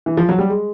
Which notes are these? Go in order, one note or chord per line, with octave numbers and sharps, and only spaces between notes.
E3
F3
F#3
G3
G#3